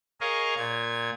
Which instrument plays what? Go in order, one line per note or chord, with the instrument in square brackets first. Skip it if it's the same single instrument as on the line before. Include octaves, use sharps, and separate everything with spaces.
[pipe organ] G#4 A#4 C#5 D#5 F5
A#2 G#6